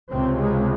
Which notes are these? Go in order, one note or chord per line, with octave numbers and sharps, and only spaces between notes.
C#2 C3 C4
G#3